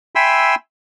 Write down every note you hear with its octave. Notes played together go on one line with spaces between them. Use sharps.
E5 G5 G#5 B5 C6 E6